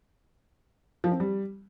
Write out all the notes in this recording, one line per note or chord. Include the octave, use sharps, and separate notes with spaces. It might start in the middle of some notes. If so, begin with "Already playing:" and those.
F3
C4
G3